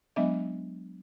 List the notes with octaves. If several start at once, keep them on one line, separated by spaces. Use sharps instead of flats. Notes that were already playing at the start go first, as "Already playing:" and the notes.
F#3 G#3 B3 D4 D#5 E5